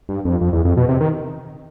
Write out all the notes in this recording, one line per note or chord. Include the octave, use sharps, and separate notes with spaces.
G2
F2
F2
E2
F2
B2
C3
D#3